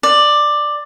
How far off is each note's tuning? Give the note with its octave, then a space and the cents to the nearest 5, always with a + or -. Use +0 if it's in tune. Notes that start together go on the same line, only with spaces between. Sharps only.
D5 +10